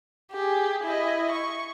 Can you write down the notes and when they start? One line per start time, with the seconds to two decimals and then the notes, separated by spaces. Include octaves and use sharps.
0.32 G4 G#4
0.83 E4 D#5
1.31 C#6